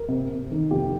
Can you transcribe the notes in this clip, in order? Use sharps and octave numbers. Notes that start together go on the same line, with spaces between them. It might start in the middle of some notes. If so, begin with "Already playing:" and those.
Already playing: A#4
C3
C3
D#3
F1 G4